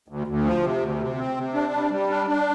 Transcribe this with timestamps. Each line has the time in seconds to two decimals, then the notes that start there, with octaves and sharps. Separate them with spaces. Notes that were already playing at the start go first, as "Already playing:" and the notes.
0.08 D2
0.27 D2
0.44 F3
0.63 C3
0.81 D2
0.99 C3
1.18 C4
1.36 C3
1.54 D4
1.73 G3
1.91 G3
2.10 D4
2.27 D4